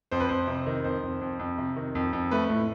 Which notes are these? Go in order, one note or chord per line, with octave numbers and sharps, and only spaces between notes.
F2 C5
B4
F2 C5
C3
D#3
F2 C5
F2
F2
F2
C3
D#3
F2
F2
A3 B4
A2